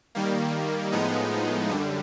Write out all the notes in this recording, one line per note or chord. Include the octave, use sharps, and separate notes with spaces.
D#3 G3 A#3
A2 F3 G#3 B3 D#4
F#2 D3 G3